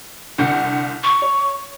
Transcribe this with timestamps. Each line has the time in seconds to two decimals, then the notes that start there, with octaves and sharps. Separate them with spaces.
0.38 C2 D3 F#5 G6
1.03 C#6
1.22 C#5